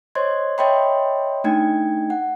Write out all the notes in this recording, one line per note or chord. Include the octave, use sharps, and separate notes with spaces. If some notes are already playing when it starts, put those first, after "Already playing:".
C5 C#5 D#5 C6 G#6
C#5 D#5 E5 G5 B5 C6
A3 D4 D#4 G5 G#6
F#5